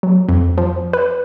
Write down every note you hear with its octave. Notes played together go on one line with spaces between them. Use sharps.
F#3
F2
F3
B4